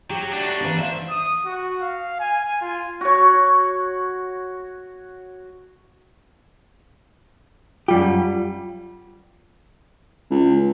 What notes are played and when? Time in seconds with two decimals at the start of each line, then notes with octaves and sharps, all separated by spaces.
0.10 F#3 G4
0.33 A3 D4 F#4
0.61 E3 A#3
0.79 C5 E5 F5
1.10 D#6
1.45 F#4
1.82 F5
2.20 G#5
2.61 F4
3.01 F#4 C#5
7.88 F#2 G3 F4 G4
10.31 C#2